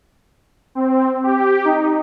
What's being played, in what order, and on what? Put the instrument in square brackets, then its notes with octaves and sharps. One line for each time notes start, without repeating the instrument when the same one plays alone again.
[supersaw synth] C4
G4
D#4